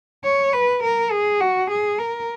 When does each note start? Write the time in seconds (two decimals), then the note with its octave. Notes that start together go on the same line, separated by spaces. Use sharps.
0.24 C#5
0.53 B4
0.84 A#4
1.12 G#4
1.41 F#4
1.71 G#4
1.99 A#4